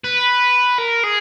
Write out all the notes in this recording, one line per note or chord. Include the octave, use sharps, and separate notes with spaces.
B4
A#4
G#4